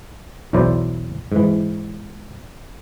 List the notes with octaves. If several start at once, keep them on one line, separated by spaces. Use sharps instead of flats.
B1 E2 F#3 E4 C5 D5
G#2 E3